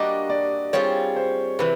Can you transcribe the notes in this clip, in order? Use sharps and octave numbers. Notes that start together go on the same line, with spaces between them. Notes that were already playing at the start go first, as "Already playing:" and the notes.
Already playing: G3 A#3 D4 F#4 D#5
D5
G3 C4 F4 G#4 C#5
C5
C3 E3 B4